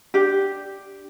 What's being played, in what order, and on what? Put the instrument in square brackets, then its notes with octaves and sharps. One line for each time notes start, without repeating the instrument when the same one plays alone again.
[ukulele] D4 G4